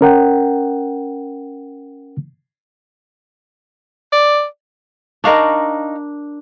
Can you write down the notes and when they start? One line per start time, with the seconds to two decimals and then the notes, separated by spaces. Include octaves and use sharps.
0.01 C#4 A#4 F#5 G5
4.12 D5
5.24 D4 D#4 A#4 F5 C#6